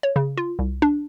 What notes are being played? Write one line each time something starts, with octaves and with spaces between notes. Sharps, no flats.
C#5
C#3
F4
C2
D4